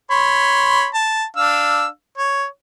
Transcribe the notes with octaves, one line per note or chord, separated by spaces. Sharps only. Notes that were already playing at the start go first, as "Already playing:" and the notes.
C#5 B5 C6
A5
D4 F5 E6
C#5